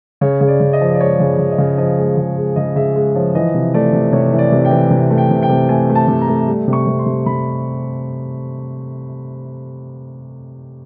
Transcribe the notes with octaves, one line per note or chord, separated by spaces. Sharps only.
C#3 C#5
C#3
D5
C#3
D#5
F3
D5
G#3 C#5
C#3
D5
C#3
D#5
C#3
F3 D#5
G#3
C#3
G#3
C#3 D#5
C#3 E5
G#3
F3 C#5
E3 D#5
C3
A3 D5
C3
C3 C#5
E3
D5
C3
G5
E3
C3
A3
G5
C3
G5
C3
A3 G#5
A3
A5
C3
A#5
A3
G3
C3
C#6
C3
C6
C3
C3 B5